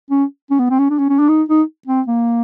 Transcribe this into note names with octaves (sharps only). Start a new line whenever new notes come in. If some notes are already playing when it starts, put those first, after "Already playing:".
C#4
C#4
B3
C4
C#4
D4
C#4
C#4
D4
D#4
D#4
C4
A#3